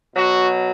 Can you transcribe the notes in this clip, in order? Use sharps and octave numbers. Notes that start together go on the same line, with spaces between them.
B2 F#3 F#4